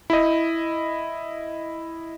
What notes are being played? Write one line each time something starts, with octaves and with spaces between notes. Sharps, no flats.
E4 D#5